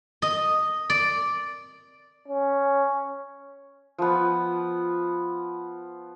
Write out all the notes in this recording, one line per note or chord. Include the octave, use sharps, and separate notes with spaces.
D#5
D5
C#4
F3 B3